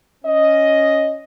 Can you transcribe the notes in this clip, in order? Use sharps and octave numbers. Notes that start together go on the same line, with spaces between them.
C#4 D#5